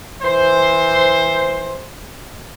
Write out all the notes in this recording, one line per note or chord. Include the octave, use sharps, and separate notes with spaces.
E3 C5